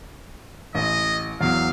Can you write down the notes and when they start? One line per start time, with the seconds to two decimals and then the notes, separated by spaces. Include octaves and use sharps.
0.75 A1 D#5
1.41 E2 F#3 F5